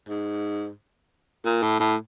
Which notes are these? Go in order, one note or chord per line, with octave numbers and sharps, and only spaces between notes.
G#2
A#2
A2
A2